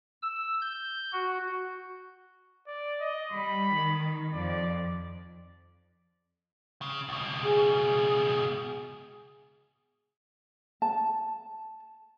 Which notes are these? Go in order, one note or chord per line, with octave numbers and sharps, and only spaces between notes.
E6
G6
F#4
D5
D#5
G3 B5
D#3
F2 F3 D5
C#3
C#2 B2
G#4
A5